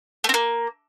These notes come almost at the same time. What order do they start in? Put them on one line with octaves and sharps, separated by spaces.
A3 C4 A#3